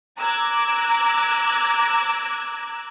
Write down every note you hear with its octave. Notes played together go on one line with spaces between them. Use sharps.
A#5 D6 E6 F#6 G#6